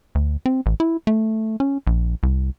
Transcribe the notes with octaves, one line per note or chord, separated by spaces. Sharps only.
D2
C4
A1
E4
A3
C#4
A#1
C2